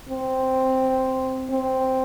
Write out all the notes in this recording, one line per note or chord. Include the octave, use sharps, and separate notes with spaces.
C4
C4